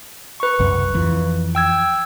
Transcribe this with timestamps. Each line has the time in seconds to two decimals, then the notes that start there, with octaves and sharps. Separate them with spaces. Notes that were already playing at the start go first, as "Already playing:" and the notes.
0.40 B4 C#6
0.59 C2 F#2
0.94 F2 E3
1.55 G5 E6 G#6